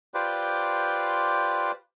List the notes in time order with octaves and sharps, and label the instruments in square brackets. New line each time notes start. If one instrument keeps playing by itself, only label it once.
[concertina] F4 G4 B4 C5 D5